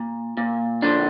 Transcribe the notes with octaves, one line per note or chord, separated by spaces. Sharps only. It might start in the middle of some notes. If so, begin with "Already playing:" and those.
Already playing: A#2
A#2
D3 F3 D4